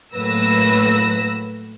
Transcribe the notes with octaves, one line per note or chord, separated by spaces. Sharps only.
A2 F#3 A#3 B4 E6 A#6